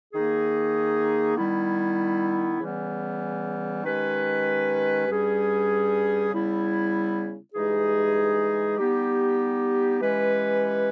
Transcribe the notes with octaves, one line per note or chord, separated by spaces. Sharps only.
D#3 A#3 D#4 G#4
D#3 G3 B3 E4
C#3 E3 G3 B3
D#3 G#3 C#4 G4 B4
G2 G3 C#4 G#4
C#3 G3 B3 E4
G2 E3 G#3 D#4 G#4
G3 B3 D#4 G4
E3 G#3 C#4 G4 B4